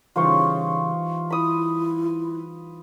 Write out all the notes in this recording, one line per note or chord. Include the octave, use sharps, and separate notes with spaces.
C#3 E3 G3 D#4 F4 C5 C#6
E4 B5 D#6